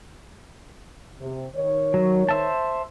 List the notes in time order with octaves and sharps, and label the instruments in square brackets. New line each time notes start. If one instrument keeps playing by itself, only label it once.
[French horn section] C3
D#3 C#5
[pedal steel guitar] F#3
C5 E5 A5